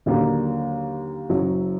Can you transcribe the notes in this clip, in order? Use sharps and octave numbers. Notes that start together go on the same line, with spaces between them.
D#2 D3 F#3 A#3
F#1 F#2 F#3